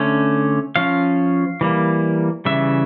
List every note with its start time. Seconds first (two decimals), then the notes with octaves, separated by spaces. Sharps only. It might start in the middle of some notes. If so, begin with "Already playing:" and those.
Already playing: D3 A3 C#4
0.76 F3 C#4 F5
1.61 E3 G3 A#3
2.45 C#3 E3 G3 E5